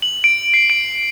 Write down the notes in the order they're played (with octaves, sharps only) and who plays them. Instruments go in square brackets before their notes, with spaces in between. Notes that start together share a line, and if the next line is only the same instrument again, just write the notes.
[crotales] F#7
D7
C7
D7